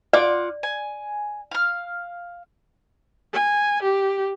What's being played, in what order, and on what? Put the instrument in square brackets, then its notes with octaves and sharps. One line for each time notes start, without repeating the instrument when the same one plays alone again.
[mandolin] F4 F#5 D6 [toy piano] D5
[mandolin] G#5
F5 F6
[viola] G#5
G4